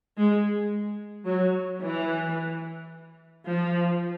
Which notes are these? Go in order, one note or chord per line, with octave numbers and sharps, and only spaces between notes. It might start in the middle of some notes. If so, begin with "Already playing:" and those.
G#3
F#3
E3
F3